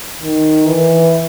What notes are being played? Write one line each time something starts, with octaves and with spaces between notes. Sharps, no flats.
D#3
E3